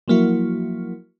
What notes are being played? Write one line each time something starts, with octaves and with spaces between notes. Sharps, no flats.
F3 F#3 A#3 E4 F#4